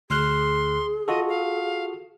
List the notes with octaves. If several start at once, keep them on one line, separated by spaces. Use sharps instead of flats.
D2 G#4 C6 F6 F#6
F4 F#4 A4 D#5
F5